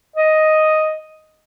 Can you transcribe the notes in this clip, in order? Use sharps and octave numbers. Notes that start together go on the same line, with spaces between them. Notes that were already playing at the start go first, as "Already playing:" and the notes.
D#5